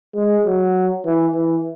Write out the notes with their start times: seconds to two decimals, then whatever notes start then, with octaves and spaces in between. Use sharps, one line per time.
0.16 G#3
0.46 F#3
1.06 E3
1.36 E3